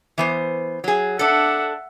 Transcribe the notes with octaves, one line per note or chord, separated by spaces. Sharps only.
E3 B3 C5
F#3 G#4
D4 A4 E5 F#5